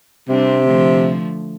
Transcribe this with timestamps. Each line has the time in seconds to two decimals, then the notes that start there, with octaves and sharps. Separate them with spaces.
0.28 C3 G3 C4 D4
0.67 D3 F3 A3